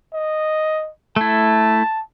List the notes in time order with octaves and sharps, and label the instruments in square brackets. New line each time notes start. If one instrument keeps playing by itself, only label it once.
[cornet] D#5
[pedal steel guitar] A3 E4 [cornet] A5